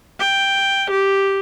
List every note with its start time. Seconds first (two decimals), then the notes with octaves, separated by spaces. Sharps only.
0.19 G5
0.90 G4